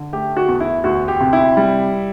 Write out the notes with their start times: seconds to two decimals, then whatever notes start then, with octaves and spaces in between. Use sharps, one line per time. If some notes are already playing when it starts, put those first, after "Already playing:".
Already playing: D3
0.13 A3 G4
0.37 F#4
0.48 E2
0.60 E4
0.84 D2 F#4
1.08 G4
1.21 C3
1.33 E4
1.57 G3